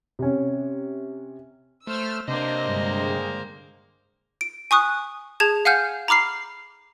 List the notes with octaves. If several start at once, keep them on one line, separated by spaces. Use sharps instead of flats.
C3 C#4
A3 C5 E6 F6
C3 A#3 D4 C5 D#5
G2 D3 G#3
D7
G#5 C#6 D#6 F#6
G#4 A5 G#6 E7
F5 F#5 G#5 F6 G6
A#5 B5 D6 F6 C7